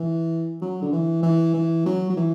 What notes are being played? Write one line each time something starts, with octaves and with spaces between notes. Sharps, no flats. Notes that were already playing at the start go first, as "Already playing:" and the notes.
Already playing: E3
F#3
D3
E3
E3
E3
F#3
F#3
E3